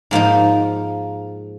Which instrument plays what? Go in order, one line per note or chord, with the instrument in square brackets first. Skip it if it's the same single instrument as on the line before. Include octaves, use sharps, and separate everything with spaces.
[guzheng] G#2 F3 A#3 D#4